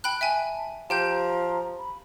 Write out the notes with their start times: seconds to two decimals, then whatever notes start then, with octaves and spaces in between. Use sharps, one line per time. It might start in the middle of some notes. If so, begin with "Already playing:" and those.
0.04 G5 A5 B5 F#6
0.21 E5 G5 G#5
0.90 F3 G4 G5 A#5 G6
1.79 B5